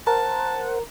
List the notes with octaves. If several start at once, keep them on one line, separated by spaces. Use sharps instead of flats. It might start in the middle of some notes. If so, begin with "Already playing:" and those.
A#4 C5 F#5 A5